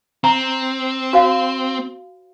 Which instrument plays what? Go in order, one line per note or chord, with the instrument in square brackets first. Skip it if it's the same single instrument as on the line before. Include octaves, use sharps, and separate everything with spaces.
[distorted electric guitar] C4 [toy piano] A#5
[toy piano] F#4 C5 F5